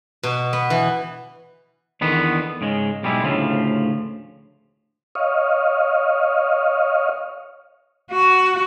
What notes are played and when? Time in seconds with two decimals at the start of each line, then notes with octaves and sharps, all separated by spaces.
0.23 B2
0.53 B3
0.70 E3
2.01 E2 D3 D#3 B3 B4
2.61 G#2 C#3 G#3
3.03 B1 G3 G#3 E4
3.24 D2 A2 C#3 F3
5.15 C#5 D#5 F5
8.11 F#4